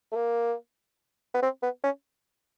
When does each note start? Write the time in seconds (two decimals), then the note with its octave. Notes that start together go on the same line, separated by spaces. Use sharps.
0.12 A3
0.16 A#3
1.34 B3
1.43 C4
1.63 B3
1.84 C#4